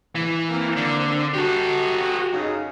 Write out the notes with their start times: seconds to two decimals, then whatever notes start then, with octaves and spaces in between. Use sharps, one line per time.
0.15 E3
0.49 A#3 C4
0.77 D3
1.34 F#4 G4 A4
2.33 F#2 C#3 D#4